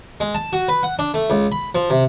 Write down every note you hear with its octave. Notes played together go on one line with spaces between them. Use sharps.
G#3
A5
F#4
B4
F#5
D4
A3
C#2
B5
F3
C3